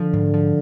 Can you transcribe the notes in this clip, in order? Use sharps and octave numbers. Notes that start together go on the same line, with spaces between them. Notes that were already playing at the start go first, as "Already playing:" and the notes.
Already playing: D3 F3
G#2
F3